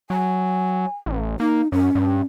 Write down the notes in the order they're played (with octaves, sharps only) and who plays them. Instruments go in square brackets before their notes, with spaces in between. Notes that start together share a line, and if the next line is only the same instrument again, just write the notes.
[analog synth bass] F#3 [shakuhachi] G#5
[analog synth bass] A1
[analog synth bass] A#3 [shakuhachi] D#4
[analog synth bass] F#2 [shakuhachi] C#4
[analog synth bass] G2